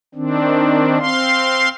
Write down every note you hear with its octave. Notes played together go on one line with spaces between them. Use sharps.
D#3 C4 D4
C4 F5 C6